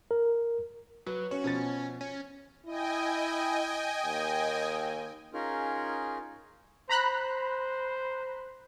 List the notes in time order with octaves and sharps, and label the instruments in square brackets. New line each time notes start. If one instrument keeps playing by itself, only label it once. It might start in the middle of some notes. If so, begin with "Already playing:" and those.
[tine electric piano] A#4
[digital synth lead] F#3 [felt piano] B4
[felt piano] C#4 [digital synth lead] F#4
[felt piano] B2 F3 A6 [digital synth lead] C#4
[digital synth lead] C#4
[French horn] E4 [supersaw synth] D#5 G5 G#5
[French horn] D#2
[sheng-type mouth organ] C#4 D#4 F4 G#4 A#4
[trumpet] C5 [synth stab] A#5 B5 F#6